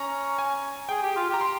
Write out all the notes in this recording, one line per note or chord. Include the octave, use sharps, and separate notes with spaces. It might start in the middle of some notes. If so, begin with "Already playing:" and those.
Already playing: C#4 A#5
G#5
G#4 G5
G4
F4
G4 A#5
C6